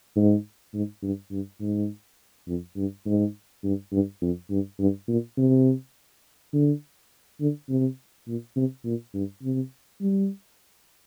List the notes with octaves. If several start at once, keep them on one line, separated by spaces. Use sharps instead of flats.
G#2
G#2
G2
G2
G#2
F2
G2
G#2
G2
G2
F2
G2
G2
A#2
C3
D3
D3
C3
A#2
C3
A#2
G2
C3
G3